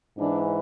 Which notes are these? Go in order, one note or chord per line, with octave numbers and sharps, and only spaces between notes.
G#2 E3 D4